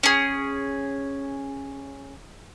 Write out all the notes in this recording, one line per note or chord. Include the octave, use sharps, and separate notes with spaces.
C#4 G#4